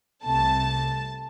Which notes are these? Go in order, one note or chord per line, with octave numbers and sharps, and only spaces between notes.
C2 C3 A3 A5